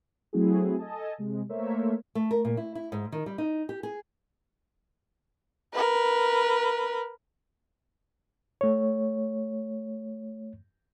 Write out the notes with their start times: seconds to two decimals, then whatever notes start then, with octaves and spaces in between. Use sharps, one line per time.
0.33 F#3 A3 C4 E4 F#4 G#4
0.78 A4 D#5 G#5 A5
1.18 C3 G#3
1.49 A3 A#3 A#4 C5 C#5 E5
2.15 A3
2.31 A#4
2.45 A#2
2.57 E4
2.75 E4
2.92 G#2
3.12 D#3
3.26 G3
3.38 D#4
3.69 G4
3.83 G#4
5.74 A#4 B4
8.61 A3 C#5